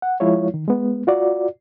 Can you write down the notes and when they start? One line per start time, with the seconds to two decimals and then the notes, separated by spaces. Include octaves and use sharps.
0.02 F#5
0.20 F3 G#3 E4 F4 C#5
0.54 D#3
0.67 G#3 B3
1.07 F4 F#4 D5